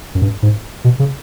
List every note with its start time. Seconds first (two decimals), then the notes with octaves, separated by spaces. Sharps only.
0.15 F#2
0.22 G2
0.43 G#2
0.84 B2
0.99 C#3